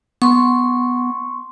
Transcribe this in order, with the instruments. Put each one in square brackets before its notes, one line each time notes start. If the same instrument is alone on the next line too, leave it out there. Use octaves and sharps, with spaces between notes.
[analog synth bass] B3 [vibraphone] C6 C#6